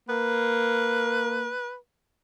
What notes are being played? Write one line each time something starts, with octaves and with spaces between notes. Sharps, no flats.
A#3 B4